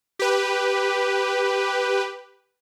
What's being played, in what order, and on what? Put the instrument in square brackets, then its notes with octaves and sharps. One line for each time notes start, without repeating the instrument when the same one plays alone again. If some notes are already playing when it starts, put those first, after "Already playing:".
[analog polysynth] G4 B4